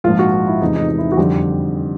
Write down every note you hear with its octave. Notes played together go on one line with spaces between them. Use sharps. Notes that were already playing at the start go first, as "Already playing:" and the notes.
A#1 G#2 F3 F4
F#4
F4
E4
E2 C3 E3 G#3 D#4
D#4
D#4
E4
F#4
F2 D3 G3 G4